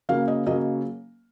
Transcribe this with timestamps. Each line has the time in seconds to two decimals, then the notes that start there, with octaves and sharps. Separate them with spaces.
0.09 C#3 F#3 A#3 F5
0.28 D#5
0.46 C#3 F#3 A#3 D#5